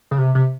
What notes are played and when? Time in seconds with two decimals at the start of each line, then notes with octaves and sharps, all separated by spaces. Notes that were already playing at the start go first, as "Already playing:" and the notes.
0.11 C#3
0.18 C3
0.35 C3